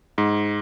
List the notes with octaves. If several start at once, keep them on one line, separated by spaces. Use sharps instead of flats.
G#2